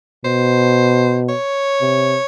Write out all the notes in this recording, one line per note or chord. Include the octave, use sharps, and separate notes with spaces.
B2 C5
C#5
C3